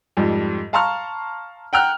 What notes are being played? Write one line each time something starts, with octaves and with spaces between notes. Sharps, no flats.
F2 G#2 G3
F5 A5 A#5 C6 C#6 F6
F#5 G5 A#5 F6 F#6